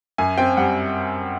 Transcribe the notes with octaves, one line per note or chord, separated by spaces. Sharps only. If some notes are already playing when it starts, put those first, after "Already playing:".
F#2 G#5
C4 G5
G3 F#5